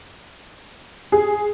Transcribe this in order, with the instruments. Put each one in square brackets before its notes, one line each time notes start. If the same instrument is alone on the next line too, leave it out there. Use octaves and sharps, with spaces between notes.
[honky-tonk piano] G#4